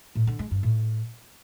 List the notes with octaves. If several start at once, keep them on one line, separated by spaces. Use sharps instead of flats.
A2
D3
G#3
G2
A2